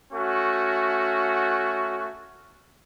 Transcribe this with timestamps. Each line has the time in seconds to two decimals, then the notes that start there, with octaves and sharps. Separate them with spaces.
0.12 A3 C#4 F#4